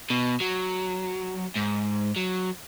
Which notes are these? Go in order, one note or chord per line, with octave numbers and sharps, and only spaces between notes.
B2
F#3
G#2
F#3